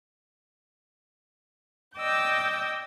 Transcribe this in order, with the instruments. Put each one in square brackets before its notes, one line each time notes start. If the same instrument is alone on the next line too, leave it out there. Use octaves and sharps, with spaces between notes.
[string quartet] D5 D#5 G5 D6 E6 G6